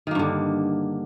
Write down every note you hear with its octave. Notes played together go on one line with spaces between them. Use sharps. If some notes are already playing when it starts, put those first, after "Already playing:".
G2 D3 D#3 A#3